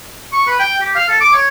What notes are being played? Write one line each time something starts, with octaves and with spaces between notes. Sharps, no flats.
C#6
B4
G5
G4
F5
A4
D6
C#5